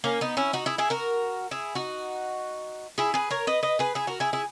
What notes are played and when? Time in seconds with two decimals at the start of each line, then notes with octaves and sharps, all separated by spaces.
0.04 A#3 C#4
0.21 B3 D#4
0.37 C#4 E4
0.53 D#4 F#4
0.66 E4 G#4
0.78 E4 G#4
0.90 F#4 A#4
1.51 E4 G#4
1.75 D#4 F#4
2.98 E4 G#4
3.14 G#4 B4
3.31 A#4 C#5
3.47 B4 D#5
3.63 B4 D#5
3.79 G#4 B4
3.95 E4 G#4
4.07 F#4 A#4
4.20 E4 G#4
4.33 E4 G#4